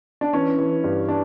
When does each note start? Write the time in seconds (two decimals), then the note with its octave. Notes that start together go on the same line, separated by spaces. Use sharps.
0.21 D4
0.33 E3 C#4
0.58 E3
0.84 G2
1.09 D4